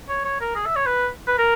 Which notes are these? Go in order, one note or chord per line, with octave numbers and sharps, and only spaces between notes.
C#5
C#5
A#4
G#4
E5
C#5
B4
B4
A#4